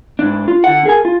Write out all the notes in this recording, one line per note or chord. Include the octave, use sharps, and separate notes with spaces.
G#2 D4
F4
D3 F#5
G#4 A#4 G#5
F4